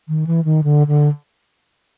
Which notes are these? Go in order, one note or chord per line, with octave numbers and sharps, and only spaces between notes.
D#3
E3
D#3
D3
D3